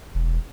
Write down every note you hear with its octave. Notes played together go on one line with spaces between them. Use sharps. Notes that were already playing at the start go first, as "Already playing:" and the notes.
E1